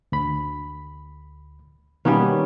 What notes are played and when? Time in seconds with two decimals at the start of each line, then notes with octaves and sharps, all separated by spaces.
0.12 D2 B5
2.05 B2 D#3 G3 A#3 B3 C#4